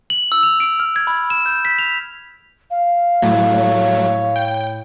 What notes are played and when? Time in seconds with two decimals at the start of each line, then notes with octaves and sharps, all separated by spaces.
0.10 F#7
0.32 E6
0.43 F7
0.60 D7
0.80 F6
0.96 G#6
1.07 B5
1.30 E7
1.46 G6
1.65 B6
1.79 F7
2.71 F5
3.22 A2 F#3 A3
3.56 C#5
4.36 G5